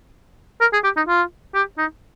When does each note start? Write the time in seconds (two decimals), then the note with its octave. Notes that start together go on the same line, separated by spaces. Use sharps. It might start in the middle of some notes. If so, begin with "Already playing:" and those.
0.61 A#4
0.73 G#4
0.84 G4
0.96 D#4
1.07 F4
1.54 G4
1.78 D#4